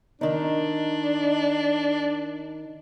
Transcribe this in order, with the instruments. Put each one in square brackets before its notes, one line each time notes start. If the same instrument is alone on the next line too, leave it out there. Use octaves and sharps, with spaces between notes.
[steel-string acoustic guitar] D#3 D#4 [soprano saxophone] D4